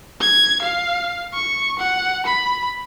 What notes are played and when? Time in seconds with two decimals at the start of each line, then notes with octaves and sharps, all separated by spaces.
0.21 G#6
0.62 F5
1.34 C#6
1.79 F#5
2.26 B5